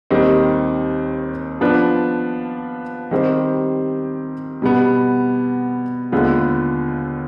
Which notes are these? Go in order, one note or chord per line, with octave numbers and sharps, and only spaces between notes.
D#2 D#3 G3 C4 G4
F3 B3 D4 F4 B4
D#3 G3 C4 G4 C5
B2 G3 B3
D#2 D3 G#3 B3 F4